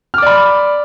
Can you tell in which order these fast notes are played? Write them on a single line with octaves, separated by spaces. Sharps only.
F6 D6 D5 B5